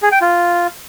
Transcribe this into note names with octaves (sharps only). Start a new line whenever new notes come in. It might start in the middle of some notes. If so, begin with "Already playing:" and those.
G#4
G5
F4